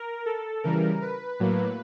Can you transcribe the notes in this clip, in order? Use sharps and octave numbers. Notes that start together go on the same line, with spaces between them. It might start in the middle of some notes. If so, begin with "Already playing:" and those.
Already playing: A#4
A4
C#3 E3 G3 A#4
B4
A2 F#3 A#3